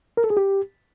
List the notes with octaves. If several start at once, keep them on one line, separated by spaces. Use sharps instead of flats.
A#4
A4
G#4
G4